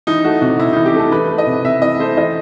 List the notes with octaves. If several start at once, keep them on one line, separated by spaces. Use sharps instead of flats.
E3 D#4
A3 F#4
C3 F#4
C3 E4
E3 D#4
G4
A3
A4
E3 B4
A3
D#5
C3
C3 E5
E3 D#5
A3 C5
E3 D#5